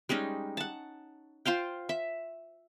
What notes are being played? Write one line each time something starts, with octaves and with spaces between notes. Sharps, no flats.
G3 G#3 C#4 D#4
F#5 A5
F4 C5 F5 G5
E5